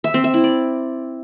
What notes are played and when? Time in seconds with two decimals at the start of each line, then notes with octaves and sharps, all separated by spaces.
0.04 E5
0.14 C4
0.24 E5
0.34 E4
0.44 D5